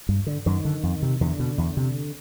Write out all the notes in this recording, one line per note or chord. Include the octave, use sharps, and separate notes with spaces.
G2
D3
F#2 D#3
D3
F2
C3
E2 D3
B2
E2
C3